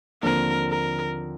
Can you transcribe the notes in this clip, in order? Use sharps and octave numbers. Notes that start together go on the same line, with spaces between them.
D#2 D3 F3 C4 A#4
A#4